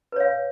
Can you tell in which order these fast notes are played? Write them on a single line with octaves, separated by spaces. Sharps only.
B4 C#5 F5